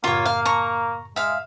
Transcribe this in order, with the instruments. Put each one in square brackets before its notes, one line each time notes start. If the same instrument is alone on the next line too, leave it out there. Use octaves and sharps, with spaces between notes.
[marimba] F#2 A2 C#3 [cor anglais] A#3 [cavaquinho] F4 C#5
[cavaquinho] F5
A#5 C#6
[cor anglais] G#3 [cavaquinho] E5 F5